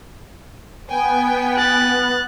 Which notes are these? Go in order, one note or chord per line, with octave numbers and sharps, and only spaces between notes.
B3 G5 G#5
F#6 A6